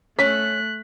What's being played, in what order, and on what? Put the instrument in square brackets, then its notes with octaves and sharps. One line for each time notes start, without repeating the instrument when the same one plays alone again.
[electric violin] A3 F#6 [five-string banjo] C#4 [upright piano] B6